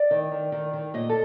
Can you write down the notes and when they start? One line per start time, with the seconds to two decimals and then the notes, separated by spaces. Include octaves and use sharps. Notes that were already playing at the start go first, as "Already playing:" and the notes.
Already playing: D5
0.11 D#3
0.32 D#3
0.52 D#3
0.73 D#3
0.94 A#2 D#5
1.09 A4